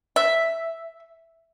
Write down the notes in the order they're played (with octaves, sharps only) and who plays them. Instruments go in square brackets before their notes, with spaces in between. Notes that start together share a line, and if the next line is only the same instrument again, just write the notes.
[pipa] E5